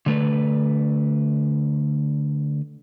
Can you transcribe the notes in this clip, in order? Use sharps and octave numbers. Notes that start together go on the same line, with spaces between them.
D3 A3 B4